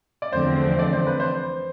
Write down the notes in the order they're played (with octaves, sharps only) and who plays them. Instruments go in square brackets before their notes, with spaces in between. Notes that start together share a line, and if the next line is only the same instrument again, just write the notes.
[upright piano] D5
[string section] E2 D3 F3 A3 C4 [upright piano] C5
[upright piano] D5
C5
B4
C5